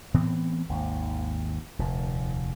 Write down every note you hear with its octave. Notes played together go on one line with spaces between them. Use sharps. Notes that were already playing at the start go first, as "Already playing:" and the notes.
A2 E3 B3 C4
G#1 D#2
F1 D#2 A#2